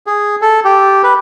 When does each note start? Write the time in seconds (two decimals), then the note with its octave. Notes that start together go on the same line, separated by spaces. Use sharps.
0.07 G#4
0.42 A4
0.65 G4
1.04 B4